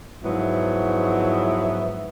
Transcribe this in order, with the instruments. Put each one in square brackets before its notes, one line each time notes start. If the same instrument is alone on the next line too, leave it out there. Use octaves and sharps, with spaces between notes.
[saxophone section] G#2 F3 F#3 B3 E4 E5